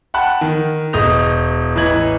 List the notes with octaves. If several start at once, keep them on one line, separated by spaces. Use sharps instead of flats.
F#5 G5 A5 B5 F#6
D#3
E1 D#5 D#6 G6 A#6 F7
A1 E3 D#5 A#5 G#6 F#7